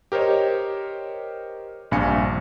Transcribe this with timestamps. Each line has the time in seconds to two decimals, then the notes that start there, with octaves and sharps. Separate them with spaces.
0.12 G4 A#4 C5 C#5 D#5
1.91 A#1 G2 C3 F5 G#5 C#7